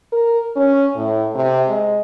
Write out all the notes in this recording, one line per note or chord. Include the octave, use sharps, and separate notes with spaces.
A#4
C#4
A2
C3
G#3